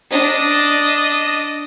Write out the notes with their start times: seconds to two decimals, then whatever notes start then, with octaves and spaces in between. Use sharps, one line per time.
0.11 D4 D#5